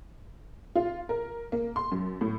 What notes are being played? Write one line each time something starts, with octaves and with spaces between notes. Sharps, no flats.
F4
A#4
A#3
C6
F#2
A2